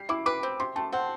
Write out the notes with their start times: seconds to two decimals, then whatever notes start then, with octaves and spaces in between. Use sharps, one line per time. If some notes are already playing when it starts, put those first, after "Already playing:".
Already playing: G3 C7
0.09 E4 D6
0.26 B4 D6
0.43 C4
0.60 C3 C6
0.76 A3 A5
0.92 C4 F#5